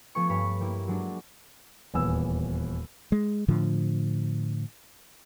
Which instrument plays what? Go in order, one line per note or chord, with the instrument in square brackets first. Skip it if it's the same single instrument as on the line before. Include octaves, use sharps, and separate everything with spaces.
[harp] F3 A3 B3 G#5 C#6
G2 C#5 B5 C#6
G3 A#3 E4
F#3 G#3 D4
[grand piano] D#1 E2 G#5 E6
[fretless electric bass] G#3
A2 D3 F3